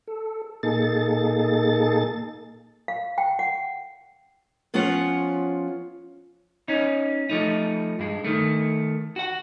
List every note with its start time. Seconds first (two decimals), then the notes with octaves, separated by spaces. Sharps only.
0.08 A4
0.63 A#2 A#3 D#4 G#4 A4 A6
2.88 F5
3.18 G5
3.39 F#5
4.74 F3 B3 C#4 F4 C#5 F#5
6.68 C#4 D#4
7.30 F3 A3 D#4
7.99 G2 G#3
8.24 D#3 A3
9.16 F#4 F#5